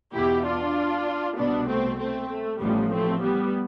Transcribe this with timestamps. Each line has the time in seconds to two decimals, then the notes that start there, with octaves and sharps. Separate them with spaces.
0.15 E2 B2 E4 G4
0.45 D4 F4
1.38 C2 B2 B3 D4
1.69 A3 C4
1.99 A3 C4
2.31 A3
2.61 A1 A2 F3 G3 B3
2.92 A3 C4
3.23 G3 B3